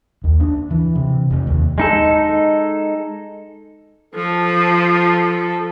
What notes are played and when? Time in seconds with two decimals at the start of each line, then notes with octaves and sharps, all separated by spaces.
0.24 D#2
0.40 D4
0.71 E3
0.95 C3
1.30 F1
1.47 D#2
1.78 G#3 D#4 A4
4.15 F3 A4